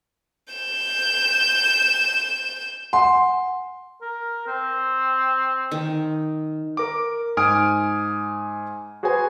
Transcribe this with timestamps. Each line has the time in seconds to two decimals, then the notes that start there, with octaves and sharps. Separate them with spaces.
0.54 G6 E7
2.93 F#5 G#5 C6
4.02 A#4
4.47 C4
5.71 D#3
6.77 A#4 D6
7.37 G#2 G#5 D#6 F6 D7
9.03 F#4 G#4 B4 C5 G#5